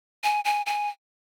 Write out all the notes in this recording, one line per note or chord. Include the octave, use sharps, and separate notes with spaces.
G#5
G#5
G#5